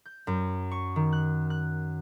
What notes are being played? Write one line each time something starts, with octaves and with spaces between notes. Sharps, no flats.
G6
F#2
C#6
D#3
F#6
F#6